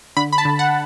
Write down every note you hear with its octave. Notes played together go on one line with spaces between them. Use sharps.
D3 B5
B5
A5
D3
F#5